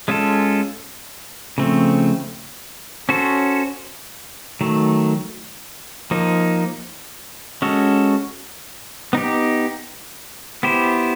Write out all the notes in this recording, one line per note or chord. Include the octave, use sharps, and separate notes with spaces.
G#3 C#4 F4 A4
C#3 F3 A3 C4
C#4 F#4 A4 C5
D#3 F#3 A3
F3 A#3 D#4
G#3 C#4 F#4 A4
B3 D#4 G4
B3 E4 G4 C5